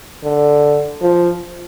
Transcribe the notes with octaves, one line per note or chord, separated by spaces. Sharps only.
D3
F3